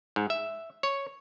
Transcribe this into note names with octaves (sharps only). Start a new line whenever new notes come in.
G#2
E5
C#5